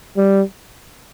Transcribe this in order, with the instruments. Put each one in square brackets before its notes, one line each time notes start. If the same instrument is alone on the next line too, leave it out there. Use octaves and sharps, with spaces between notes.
[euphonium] G3